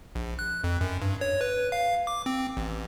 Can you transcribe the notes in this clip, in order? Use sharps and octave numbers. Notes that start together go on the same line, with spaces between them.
A#1
F#6
F2
F#2
G2
C#5
B4
F5
D6
C4
A1